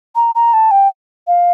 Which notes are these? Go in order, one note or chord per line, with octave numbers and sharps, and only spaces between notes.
A#5
A#5
A5
G5
F5